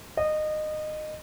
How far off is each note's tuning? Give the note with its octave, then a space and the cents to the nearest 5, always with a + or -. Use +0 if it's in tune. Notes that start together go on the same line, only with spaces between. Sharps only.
D#5 -20